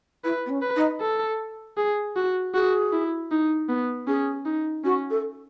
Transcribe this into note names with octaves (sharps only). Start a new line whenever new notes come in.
E4 B4
B3
C#4
B4
D#4
A4
G#4
F#4
F#4 G#4
E4
D#4
B3
C#4 G#4
D#4
C#4 F#4
A4